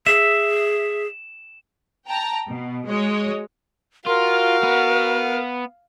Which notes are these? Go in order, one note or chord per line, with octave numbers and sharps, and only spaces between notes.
G#4 E5 E7
G5 A5 A#5
B2
G#3 F#4 C#5 D#5
F4 F#4 A#4 F5
B3